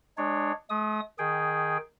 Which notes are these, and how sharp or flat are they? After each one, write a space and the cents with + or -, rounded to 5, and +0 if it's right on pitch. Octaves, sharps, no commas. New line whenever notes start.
G#3 +0 D4 +20 C#5 +0
A3 -45 D#6 +10
D#3 -5 G#4 +0 G5 +0